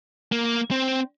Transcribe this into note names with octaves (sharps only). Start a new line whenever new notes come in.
A#3
C4